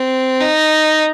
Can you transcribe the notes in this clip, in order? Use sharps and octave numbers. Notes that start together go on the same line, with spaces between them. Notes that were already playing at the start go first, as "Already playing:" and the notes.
Already playing: C4
D#4